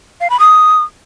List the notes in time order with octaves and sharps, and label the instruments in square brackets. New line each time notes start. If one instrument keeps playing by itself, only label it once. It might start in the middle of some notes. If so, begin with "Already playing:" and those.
[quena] F5
B5
D#6